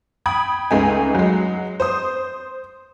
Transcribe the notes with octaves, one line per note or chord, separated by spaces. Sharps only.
G5 B5 D#6 G#6
C#2 G#3 A3 D#4 G#5
F#3 G#3
C5 C6 D#6